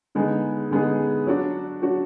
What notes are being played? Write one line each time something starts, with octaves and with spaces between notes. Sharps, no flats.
D3 G#3 B3 D#4 G#4
D3 G#3 B3 D#4 G#4
F#3 D4 F#4
F#3 D4 F#4